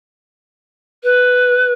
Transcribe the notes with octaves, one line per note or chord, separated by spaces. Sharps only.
B4